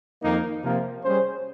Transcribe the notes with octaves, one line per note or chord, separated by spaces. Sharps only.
F2 D#3 A#3 D#4
C3 F3 A#3
G3 C#4 G#4 C5